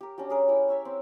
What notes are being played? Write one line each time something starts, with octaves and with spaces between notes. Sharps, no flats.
G4 A#4
C#4 D4 F#4 G4
C#4 G#4 A#4
E4 G4
C#5 E5 C#6
C4